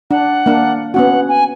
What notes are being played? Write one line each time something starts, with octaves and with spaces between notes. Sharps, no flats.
D4 F#5
A#3 D4
B3 C#4 F#4 F#5
G#5